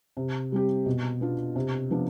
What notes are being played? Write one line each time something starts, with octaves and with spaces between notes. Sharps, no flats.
C3
G3 C4 G4
B2
B3 D4 F4
C3
F3 B3 D4 F4